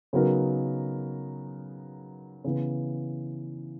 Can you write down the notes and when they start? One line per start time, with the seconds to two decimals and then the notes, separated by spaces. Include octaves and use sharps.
0.13 C#3 F#3 B3 D#4 A#4
2.44 C#3 E3 B3